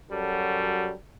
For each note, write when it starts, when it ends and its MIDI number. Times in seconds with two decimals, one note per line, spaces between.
0.11 0.93 42
0.11 0.93 54
0.11 0.93 55
0.11 0.93 69